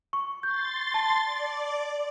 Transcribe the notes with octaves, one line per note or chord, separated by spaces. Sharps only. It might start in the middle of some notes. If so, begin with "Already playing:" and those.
C#6
C6 G6 A6
A5
D5